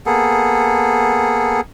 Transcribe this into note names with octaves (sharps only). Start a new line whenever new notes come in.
A#3 B3 G#4 A4